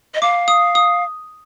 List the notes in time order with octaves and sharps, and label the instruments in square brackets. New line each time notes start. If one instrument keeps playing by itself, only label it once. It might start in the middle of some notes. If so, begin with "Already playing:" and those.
[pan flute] D#5
[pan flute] F5 [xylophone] D6
[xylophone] D#6
D#6